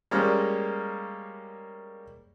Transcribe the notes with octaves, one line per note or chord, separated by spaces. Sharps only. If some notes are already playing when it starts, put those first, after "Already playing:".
G3 G#3 A#3 C#4 C5 F6